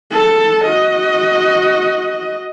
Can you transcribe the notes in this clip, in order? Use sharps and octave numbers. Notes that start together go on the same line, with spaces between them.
A4 A5
F#4 D#5